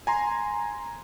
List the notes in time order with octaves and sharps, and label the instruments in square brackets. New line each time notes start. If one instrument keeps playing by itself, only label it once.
[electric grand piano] G#5 A#5 C6